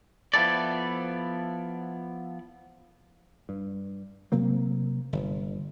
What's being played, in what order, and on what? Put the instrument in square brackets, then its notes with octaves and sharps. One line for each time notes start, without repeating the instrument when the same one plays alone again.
[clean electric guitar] F3 B3 E4 A4 D5
[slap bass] G2
C3 F#3 A#3 C4
G1